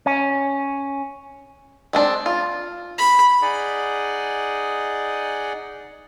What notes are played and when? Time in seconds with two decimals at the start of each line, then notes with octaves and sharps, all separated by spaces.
0.06 C#4
1.93 G#3 C4 D4
2.26 F4
2.98 B5
3.42 D#4 G#4 D5 D#5 F#5